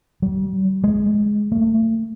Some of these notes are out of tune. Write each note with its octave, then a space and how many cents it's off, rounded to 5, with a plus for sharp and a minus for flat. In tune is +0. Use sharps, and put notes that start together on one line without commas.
G3 -45
G#3 +5
A3 +35